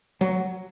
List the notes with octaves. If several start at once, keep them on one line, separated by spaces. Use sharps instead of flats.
F#3